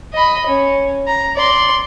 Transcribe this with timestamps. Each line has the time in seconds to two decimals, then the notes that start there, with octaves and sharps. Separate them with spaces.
0.14 D#5 B5
0.46 C#4
1.07 A#5
1.36 D5 C6